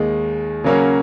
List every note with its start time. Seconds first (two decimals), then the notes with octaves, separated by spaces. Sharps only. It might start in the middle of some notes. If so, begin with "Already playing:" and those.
Already playing: D#2 D#3 G#3 D#4
0.64 C#3 F#3 A#3 C#4